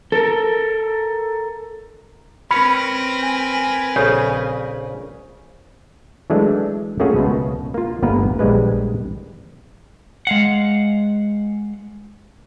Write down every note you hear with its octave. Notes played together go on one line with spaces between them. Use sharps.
A4 A#4
C4 C#4 A#4 B4 B5
G#5
A#1 C#3 A4 C#5
E3 F#3 G#3 A3 D4
A3 A#3 C#4 F4 F#4 G#4
C#2 B2
A#3 F4
G1 D2 A#3 B3 A#4 B4
A#1 G3 G#3 B4
G#3 F5 F#5